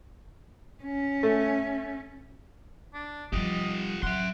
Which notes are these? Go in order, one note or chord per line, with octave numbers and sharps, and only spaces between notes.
C#4
A3
D4
F3 G3 F4 G4 D#5
F#3 E5 F#5 C6